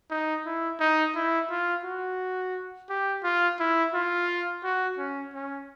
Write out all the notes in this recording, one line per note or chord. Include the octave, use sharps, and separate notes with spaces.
D#4
E4
D#4
E4
F4
F#4
G4
F4
E4
F4
F#4
C#4
C#4